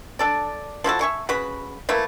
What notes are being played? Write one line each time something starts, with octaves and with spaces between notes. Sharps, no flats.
D4 A4 D5
F3 E4 F#4 A4
E5 G#5 C#6
C#3 F#4 B4 B5
A3 A#3 E4 B4